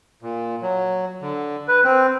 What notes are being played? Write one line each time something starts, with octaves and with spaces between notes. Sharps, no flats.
A#2
F#3
D3
B4
C4